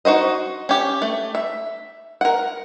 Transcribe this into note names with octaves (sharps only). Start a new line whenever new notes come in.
D#4 F#4 C5 D#5
C#4 G4
A3
E5
A#4 F#5